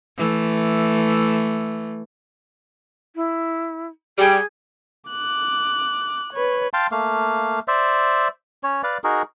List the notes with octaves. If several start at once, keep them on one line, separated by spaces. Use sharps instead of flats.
E3 A3
E4
G3 G#4 G5
D6 F#6
B4 C#5
F5 G5 A5 C6
A3 A#3 F5
C5 D5 E5
C#4 C#5
B4 D5 F5
D#4 F#4 G#4 A#4